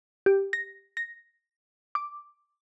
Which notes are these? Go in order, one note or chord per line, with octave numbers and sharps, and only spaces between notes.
G4
A#6
A#6
D6